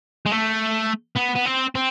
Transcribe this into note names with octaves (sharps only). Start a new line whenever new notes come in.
G#3
A3
B3
B3
C4
C4